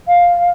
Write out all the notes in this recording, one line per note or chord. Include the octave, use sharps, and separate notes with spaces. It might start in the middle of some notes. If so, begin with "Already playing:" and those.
F5